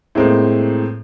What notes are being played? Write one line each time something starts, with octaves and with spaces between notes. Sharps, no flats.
A2 G#3 A#3 C4